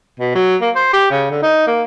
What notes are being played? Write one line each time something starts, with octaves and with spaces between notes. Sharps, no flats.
B2
F#3
A#3
C5
G4
C#3
D3
D#4
A#3